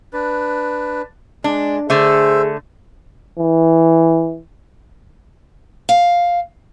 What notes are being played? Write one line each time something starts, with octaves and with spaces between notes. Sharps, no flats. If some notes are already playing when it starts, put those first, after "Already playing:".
D4 B4
G#3 D4
D3 A3 G#4 C5 E5
E3
F5